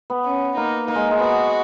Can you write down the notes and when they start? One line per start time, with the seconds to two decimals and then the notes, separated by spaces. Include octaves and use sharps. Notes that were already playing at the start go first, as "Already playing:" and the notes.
0.10 B3
0.25 C#4
0.57 A#3 D#4
0.88 A#3 D#4
0.95 G#3
1.11 G#3
1.19 B3 F#4